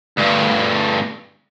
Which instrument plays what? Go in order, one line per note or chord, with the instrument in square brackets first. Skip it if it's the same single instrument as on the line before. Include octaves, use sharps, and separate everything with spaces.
[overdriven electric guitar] D2 G2